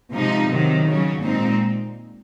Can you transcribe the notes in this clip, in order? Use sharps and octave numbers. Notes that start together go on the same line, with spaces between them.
C3 F3 G#3 D#4
C3 D#3 F#3
C#3 F#3 C#4
A#2 G#3 C4 D#4